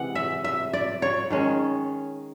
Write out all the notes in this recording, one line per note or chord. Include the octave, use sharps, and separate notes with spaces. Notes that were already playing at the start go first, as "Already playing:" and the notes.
Already playing: C3 E3 G#3 F#5
E5
E5
D5
C#5
D#3 G#3 C#4